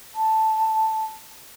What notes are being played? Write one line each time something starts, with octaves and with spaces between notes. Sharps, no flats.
A5